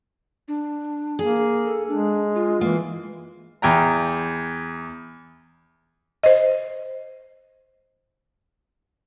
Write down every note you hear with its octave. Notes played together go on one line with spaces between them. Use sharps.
D4
A#3 G#4
A4
G#3 D4
F4
E3 A#3
E2 G5 A#5
C5 D#5